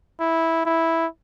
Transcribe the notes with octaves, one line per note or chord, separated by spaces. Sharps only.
E4
E4